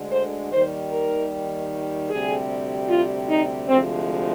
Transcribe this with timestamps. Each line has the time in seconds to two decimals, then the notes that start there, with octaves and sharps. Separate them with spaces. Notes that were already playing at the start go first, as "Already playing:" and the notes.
Already playing: D2 D3 G#3
0.12 C5
0.52 D#2 D#3 G3 C5
0.91 A#4
2.10 D2 C3 G3 G#4
2.89 F4
3.29 D#4
3.68 D2 C3 F3 G#3 C4